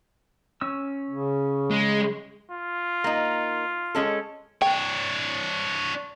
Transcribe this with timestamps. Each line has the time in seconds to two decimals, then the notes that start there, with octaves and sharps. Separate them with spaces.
0.61 C#4 E6
1.10 C#3
1.71 G#3
2.52 F4
3.04 A#3 D#4
3.95 G#3 C#4 A4
4.62 D4 C#5 G5